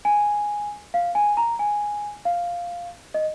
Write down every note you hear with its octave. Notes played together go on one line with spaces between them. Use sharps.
G#5
F5
G#5
A#5
G#5
F5
D#5